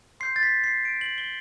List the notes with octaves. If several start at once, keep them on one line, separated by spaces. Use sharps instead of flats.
C6 G6 C7
A6
B6
C7
D7
F#7
G7